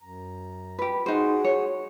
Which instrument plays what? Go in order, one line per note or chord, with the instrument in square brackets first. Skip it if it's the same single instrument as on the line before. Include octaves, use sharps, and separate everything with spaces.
[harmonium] F#2 A#5
[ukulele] G4 B4
[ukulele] D#4 C5 [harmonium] F#4 G#4 F#5
[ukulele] C#5